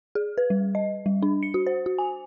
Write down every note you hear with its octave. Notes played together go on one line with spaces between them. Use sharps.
G#4
B4
G3
D#5
G3
D4
C#7
F#4
C5
F#4
G#5